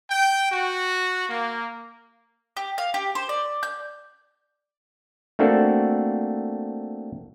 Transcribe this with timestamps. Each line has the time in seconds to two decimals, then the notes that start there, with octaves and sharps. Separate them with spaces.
0.11 G5
0.51 F#4
1.29 A#3
2.57 G4
2.78 F5
2.94 G4
3.15 C5
3.29 D5
3.63 G6
5.39 A3 A#3 C4 D4 F#4 A4